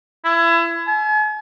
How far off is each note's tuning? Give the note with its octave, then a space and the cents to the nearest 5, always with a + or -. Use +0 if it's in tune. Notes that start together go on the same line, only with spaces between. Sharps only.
E4 +30
G#5 +45